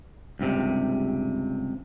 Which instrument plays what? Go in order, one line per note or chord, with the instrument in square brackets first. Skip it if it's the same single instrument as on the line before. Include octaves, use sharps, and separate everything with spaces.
[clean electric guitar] C#2 G2 C3